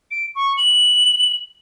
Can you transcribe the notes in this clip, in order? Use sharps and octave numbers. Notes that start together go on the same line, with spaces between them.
D7
C#6
F#7